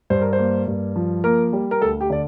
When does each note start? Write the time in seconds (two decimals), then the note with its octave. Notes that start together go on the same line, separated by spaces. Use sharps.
0.10 G2 C5
0.21 A#4
0.33 C5
0.38 A#3
0.68 G2
0.96 F3
1.24 A#3 A#4
1.53 G3
1.71 A#4
1.82 D2 A4
2.01 G4
2.10 D3 D5